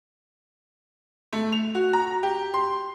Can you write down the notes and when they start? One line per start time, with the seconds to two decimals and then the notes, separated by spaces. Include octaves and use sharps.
1.33 A3
1.52 F7
1.75 F#4
1.93 A#5
2.23 G4
2.54 C6